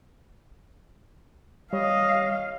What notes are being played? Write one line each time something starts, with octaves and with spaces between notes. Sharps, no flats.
G3 C#5 D#5 F5